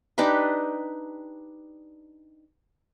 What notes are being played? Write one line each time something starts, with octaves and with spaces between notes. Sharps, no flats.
D4 D#4 G4 B4